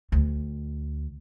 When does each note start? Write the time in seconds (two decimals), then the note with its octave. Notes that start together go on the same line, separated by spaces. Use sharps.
0.12 D2